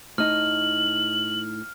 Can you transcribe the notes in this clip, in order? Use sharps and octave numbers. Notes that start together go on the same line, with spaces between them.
A2 D#4 F6 F#7